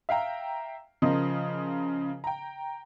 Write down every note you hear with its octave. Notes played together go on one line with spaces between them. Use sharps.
E5 F5 G5 A#5
C#3 F3 A#4 C5 D#5 D#6
G5 A#5